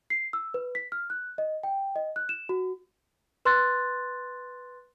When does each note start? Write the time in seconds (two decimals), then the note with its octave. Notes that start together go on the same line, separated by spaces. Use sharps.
0.10 C7
0.33 E6
0.54 B4
0.75 B6
0.92 F6
1.10 F#6
1.38 D#5
1.63 G5
1.96 D#5
2.16 F#6
2.29 E7
2.49 F#4
3.45 B4 C6 F#6 A6